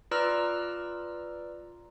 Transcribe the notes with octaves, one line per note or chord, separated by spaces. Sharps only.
F4 B4 D5 A#5 E6 F6